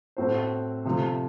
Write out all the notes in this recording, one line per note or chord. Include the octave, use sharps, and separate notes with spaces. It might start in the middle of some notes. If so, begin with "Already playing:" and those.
A2 A3 C4 F#4 C5
C3 F3 A3